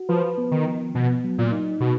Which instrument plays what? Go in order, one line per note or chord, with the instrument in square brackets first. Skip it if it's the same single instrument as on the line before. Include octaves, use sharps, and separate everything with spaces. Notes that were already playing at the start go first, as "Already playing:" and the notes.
Already playing: [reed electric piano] F#4
[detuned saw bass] F3 [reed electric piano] B4
[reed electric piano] B3
[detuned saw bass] D#3
[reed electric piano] F3
[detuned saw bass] B2 [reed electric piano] B3
[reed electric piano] F#3
[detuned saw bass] A#2
[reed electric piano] D#4
[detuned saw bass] B2 [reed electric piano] F#4